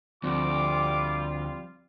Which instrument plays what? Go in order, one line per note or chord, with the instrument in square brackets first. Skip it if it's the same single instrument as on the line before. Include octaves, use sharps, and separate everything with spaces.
[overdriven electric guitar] D2 [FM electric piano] F3 C4 [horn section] G3 F4 [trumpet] D6